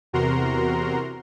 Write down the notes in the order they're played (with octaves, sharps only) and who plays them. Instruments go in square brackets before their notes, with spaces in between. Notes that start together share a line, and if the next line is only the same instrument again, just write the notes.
[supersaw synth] E2 C3 F#4 A#4 A#5 C6